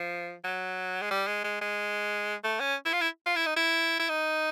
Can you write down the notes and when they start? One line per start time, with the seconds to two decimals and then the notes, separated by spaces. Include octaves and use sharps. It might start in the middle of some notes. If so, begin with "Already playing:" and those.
Already playing: F3
0.44 F#3
1.02 G#3
1.11 G3
1.27 G#3
1.44 G#3
1.61 G#3
2.44 A3
2.60 C#4
2.85 E4
2.93 F4
3.01 E4
3.26 F4
3.36 E4
3.46 D#4
3.56 E4
3.99 E4
4.09 D#4